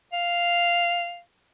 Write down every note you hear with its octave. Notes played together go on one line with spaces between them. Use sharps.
F5